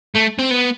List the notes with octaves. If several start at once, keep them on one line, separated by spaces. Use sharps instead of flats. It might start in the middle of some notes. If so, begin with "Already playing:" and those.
A3
C4
B3